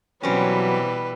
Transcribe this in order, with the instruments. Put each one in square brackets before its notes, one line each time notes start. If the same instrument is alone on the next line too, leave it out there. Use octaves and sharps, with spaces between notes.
[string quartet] B2 E3 G3 [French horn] F#3 [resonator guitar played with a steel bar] C4 C#4 [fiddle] B4